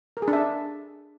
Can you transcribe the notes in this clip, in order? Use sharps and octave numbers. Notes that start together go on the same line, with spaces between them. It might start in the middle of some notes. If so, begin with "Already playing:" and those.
A#4
G#4
D4
E5